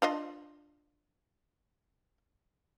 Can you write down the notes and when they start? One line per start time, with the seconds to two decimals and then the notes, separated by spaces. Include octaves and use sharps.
0.02 D4 F4 D#5